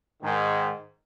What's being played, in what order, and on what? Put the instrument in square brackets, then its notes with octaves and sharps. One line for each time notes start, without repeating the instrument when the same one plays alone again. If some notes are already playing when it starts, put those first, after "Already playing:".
[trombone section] G#2 D#3